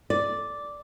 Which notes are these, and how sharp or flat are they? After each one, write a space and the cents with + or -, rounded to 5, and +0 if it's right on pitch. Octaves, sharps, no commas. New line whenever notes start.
D5 -5